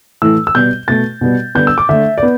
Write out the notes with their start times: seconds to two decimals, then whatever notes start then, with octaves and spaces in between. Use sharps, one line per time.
0.22 A2 E3 A3 E6
0.47 E6
0.55 B2 G3 B3 G6
0.88 B2 A3 A6
1.21 B2 G3 B3
1.55 D3 G3 B3 G6
1.67 E6
1.78 D6
1.89 D3 A3 E5
2.18 D5
2.23 B3